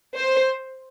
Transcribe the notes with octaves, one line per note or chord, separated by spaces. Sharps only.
C5